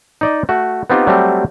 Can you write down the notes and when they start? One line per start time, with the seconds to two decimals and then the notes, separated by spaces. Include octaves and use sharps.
0.21 D#4 D5 D#5
0.49 A3 F#4
0.90 B3 C4 D#4 F4 G4
1.07 F#3 G3 A3 C4 G4